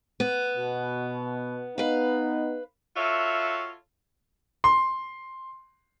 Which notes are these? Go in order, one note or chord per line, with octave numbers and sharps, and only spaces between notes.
B3
B2
B3 D#4 B4 F5
F4 F#4 A4 C#5 E5 F5
C6